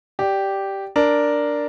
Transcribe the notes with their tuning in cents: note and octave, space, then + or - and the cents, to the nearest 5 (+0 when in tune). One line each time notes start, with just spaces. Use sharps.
G4 -5 D5 +0
D4 +0 A#4 +0